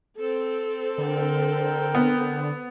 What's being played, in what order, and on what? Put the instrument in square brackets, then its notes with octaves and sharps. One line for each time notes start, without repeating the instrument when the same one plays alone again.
[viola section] C4 A4
[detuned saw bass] D3 [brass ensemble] A#4 G5
[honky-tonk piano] B3